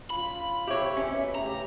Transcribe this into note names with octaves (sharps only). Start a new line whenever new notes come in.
C#4 F4 B5
G4 C#5 E5
B2 C#4
A2 C#3 G4 A#5